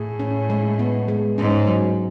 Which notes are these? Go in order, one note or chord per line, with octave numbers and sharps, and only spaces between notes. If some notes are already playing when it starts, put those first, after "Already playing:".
Already playing: A2 G#4
C#4
G#3
B3
G#3
G#2 C#4
F#3